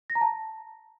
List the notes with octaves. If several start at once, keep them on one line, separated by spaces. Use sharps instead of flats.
A#6
A#5
A5